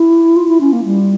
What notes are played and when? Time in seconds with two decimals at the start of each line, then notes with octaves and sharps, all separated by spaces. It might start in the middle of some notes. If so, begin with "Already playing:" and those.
Already playing: E4
0.36 F4
0.48 E4
0.60 C#4
0.73 A#3
0.85 G3